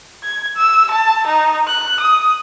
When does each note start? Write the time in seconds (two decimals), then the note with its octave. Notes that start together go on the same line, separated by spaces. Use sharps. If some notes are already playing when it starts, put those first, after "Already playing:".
0.24 G#6
0.56 E6
0.91 A5
1.27 D#4
1.67 F#6
2.00 D#6